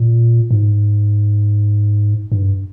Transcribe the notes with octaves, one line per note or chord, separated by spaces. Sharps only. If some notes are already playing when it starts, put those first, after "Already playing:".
Already playing: A#2
G#2
G2